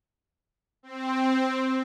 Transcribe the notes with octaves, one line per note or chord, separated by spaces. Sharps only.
C4